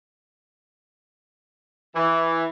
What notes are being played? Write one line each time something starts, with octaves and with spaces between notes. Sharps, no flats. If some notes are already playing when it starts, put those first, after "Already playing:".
E3